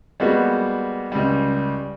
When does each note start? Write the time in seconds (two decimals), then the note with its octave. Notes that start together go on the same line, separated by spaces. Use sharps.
0.20 G3 G#3 A#3 B3 F#4
1.12 C#2 G3